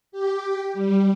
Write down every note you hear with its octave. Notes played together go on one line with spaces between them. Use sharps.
G4
G3